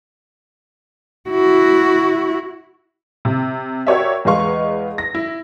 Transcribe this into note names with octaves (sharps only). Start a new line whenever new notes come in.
E4 F#4
C3
F#4 G4 A#4 C#5 D5 E5
E2 G#3 B4 F5 C#6
A#6
E4